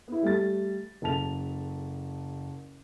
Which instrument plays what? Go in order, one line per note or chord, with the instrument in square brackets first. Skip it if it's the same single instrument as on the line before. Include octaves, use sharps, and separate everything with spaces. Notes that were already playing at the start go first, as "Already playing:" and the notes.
[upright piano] B3 E4
G3 A3 A4 A6
F#1 A4 A5 F7